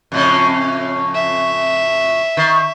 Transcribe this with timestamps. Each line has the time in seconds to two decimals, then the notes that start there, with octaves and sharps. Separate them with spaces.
0.12 F2 A2 C#3
1.14 E5
2.37 D#3